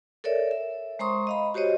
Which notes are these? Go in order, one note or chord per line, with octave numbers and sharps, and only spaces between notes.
A4 A#4 C#5 D5 E5
E5
G#3 C5 A#5 C6 C#6 D#6
D#5 F5 B5
F#4 G4 C5 C#5 D#5